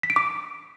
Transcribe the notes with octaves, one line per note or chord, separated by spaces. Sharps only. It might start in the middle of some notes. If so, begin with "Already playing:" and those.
B6
D7
D6